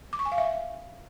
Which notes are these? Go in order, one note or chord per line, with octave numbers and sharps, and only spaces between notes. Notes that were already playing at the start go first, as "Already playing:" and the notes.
D6
C#6
G#5
F5
E5